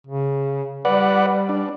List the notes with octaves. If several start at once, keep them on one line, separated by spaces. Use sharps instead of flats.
C#3
G3 B4 D5 F#5
D4